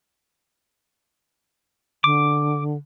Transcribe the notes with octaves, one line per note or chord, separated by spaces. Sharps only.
D3 D6